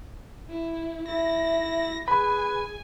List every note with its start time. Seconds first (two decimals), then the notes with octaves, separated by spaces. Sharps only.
0.50 E4
1.08 E4 E5 A#6
2.08 G#4 B4 G#5 B5